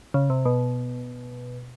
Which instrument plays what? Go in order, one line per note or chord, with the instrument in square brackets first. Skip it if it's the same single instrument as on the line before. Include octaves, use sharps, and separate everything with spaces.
[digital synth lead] C#3
C3
B2